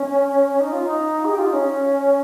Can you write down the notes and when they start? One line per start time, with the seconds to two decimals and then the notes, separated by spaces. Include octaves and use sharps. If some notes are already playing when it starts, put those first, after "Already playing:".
Already playing: C#4
0.60 D#4
0.72 F4
0.84 D#4
1.25 G#4
1.32 G4
1.38 F4
1.46 D#4
1.53 C#4